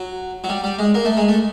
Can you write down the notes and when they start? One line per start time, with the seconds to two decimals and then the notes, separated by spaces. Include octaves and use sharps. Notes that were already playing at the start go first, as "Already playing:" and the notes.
Already playing: F#3
0.44 F#3
0.49 G3
0.64 G3
0.79 G#3
0.94 A#3
1.05 A3
1.17 G#3
1.29 A3